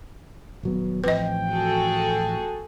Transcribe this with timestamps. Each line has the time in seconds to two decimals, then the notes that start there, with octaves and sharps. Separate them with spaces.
0.63 D#1 F#3 B3
1.04 A1 F3 C4 B4 D#5 G5
1.52 F#4 G#4 A4